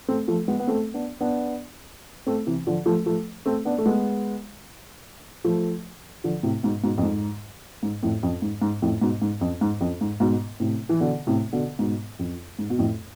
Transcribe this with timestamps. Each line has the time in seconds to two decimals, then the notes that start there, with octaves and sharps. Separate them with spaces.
0.08 A3 C4
0.28 F3 A3
0.48 G#3 B3
0.60 B3
0.67 A3 C4
0.94 B3 D4
1.21 B3 D4
2.27 A3 C4
2.47 C3 E3
2.67 D3 F3
2.86 F3 A3
3.06 F3 A3
3.46 A3 C4
3.65 B3 D4
3.78 A3
3.86 G#3 B3
5.45 F3 A3
6.24 D3 F3
6.43 A2 C3
6.63 G#2 B2
6.83 G#2 B2
6.98 F2
7.03 G#2
7.83 G#2
8.03 F2 A2
8.23 F2
8.42 G#2
8.62 G#2
8.82 F2 A2
9.01 G#2 B2
9.22 G#2
9.41 F2
9.61 G#2
9.81 F2
10.01 G#2
10.20 G#2 B2
10.60 A2 C3
10.89 E3
11.00 B2 D3
11.27 A2 C3
11.53 B2 D3
11.79 G#2 B2
12.19 F2
12.59 G#2
12.70 B2
12.78 F2 A2